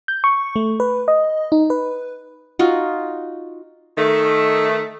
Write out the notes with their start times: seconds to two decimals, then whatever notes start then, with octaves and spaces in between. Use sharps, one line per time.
0.08 G6
0.24 C#6
0.56 A3
0.80 B4
1.08 D#5
1.52 D#4
1.70 B4
2.59 D#4 F4 F#4
3.97 D#3 A3